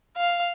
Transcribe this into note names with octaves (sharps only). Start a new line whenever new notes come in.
F5